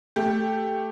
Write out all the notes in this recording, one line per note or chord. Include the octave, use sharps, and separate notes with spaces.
A3 G4